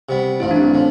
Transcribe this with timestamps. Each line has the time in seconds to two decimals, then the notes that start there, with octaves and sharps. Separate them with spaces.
0.09 C3 G3 B3 G4
0.40 A1 G2 F3 E4
0.51 D4
0.56 C4
0.74 A2 F3